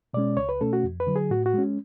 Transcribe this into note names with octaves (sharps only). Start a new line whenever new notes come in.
B2 G#3 C#4 D5
C#2 C#5
B4
B2 A3 C#4 A4
F#4
F2
B4
D3 F#3
G#4
A2 F#4
F#4
G#3 C#4